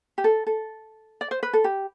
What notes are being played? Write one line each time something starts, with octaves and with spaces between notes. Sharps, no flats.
G4
A4
A4
D5
C5
B4
A4
G4